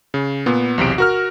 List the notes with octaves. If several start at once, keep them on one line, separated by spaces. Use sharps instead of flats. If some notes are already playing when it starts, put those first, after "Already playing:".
C#3
A#2 B3
B1 E2 C3 D7
F#4 A#4 F6